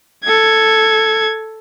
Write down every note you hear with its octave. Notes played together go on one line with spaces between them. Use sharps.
A4 G#6